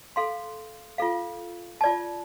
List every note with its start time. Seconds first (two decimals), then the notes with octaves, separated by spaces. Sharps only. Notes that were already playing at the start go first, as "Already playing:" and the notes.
0.16 A4 F5 C6
0.98 F4 A4 F5
1.81 F4 D5 A5